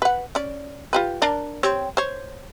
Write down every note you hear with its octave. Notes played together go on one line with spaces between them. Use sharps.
B4 F#5
C#4 D5
F4 G4 B4
D4 A#4 D5
C4 G4 C#5
C5 C#5